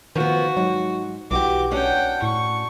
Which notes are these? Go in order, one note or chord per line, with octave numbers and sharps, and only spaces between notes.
D#3 F3 B3 F#4
G#2 F#3
B1 E3 F#4 G4 D6
C#4 D4 F#4 F#5 G5
A2 C#6